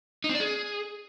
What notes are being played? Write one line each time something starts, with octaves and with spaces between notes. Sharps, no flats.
D#4
C4
D5
G#4